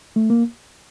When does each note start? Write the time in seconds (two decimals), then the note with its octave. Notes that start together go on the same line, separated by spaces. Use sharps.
0.16 A3
0.30 A#3